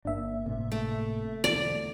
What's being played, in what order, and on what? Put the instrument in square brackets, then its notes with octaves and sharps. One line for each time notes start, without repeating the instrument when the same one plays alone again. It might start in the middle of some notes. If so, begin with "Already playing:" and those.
[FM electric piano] G1 E5 [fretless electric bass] A#3 D4
[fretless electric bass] A2 C3 A#3
[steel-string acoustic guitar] A3
[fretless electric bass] B1 E2 D3 [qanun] D5